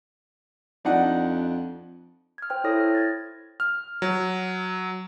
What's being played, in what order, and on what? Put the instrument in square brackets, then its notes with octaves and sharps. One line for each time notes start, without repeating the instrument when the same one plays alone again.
[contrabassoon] F2 [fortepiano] D4 D#4 F#5
[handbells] F6 G#6
C5 G5 F6
E4 A4 C#5 D#6 A#6
F6
G#6 A6
[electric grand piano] F6
F#3